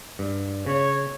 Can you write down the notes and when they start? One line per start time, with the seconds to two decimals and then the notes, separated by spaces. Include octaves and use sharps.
0.19 G2
0.66 C#3 C#5